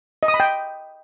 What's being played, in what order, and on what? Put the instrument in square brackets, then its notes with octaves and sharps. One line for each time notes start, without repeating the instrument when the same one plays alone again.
[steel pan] D#5
D#6
B5
G5